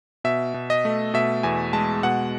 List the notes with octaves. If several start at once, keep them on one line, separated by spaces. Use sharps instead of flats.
B2 E5
B2
D#5
A3
B2 E5
E2 G#5
G#3 A5
B2 F#5